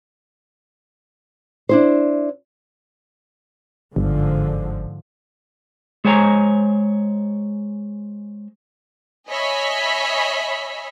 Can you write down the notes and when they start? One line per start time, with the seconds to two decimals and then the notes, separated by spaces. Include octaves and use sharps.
1.69 D4 E4 C5
3.96 G1 G#2 D3 F3
6.05 G#3 C5 C#5 G#5 A#5
9.29 C#5 D#5 E5 G#5 B5